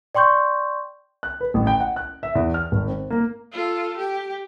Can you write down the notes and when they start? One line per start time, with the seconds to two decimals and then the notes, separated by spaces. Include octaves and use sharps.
0.15 D5 G5 C6 C#6 G6
1.23 F#6
1.41 B4
1.54 A1
1.67 G5
1.80 F#5
1.96 F#6
2.23 E5
2.35 E2
2.54 F6
2.72 G#1
2.88 C4
3.10 A#3
3.52 F4 A4
3.97 G4